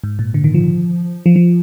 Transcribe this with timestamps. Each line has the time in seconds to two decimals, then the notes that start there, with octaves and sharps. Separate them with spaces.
0.04 G#2
0.19 A#2
0.34 D3
0.44 D#3
0.54 F3
1.26 F3
1.36 F3